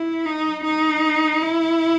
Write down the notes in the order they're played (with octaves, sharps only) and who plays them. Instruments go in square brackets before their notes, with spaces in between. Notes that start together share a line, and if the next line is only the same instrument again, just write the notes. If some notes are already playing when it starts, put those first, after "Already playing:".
Already playing: [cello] E4
D#4
D#4
E4